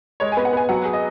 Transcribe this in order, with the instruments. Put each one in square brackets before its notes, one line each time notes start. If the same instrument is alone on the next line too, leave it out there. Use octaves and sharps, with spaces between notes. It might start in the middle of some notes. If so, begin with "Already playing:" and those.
[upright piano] G#3 [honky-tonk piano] C#5
[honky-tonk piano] G#5
[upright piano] B3
[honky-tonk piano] F#5
[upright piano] B3 [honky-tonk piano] G#5
[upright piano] F#3 [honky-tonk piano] F#5
[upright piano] G#4
[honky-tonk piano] D#5